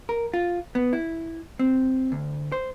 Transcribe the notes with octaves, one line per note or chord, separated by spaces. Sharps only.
A#4
F4
B3
E4
C4
D2
C5